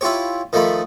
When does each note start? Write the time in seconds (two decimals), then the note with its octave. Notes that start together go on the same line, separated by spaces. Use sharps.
0.01 E4 F4 G4 C#5
0.53 D#3 F3 A3 B5